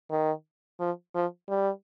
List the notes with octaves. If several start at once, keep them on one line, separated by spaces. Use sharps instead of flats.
D#3
F3
F3
G3